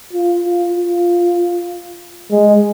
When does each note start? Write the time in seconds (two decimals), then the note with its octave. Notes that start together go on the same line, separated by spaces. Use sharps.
0.13 F4
0.44 F4
0.75 F4
2.31 G#3